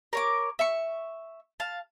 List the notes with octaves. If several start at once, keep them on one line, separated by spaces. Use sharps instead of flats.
A#4 C#5 D6
E5 C#6
F5 A5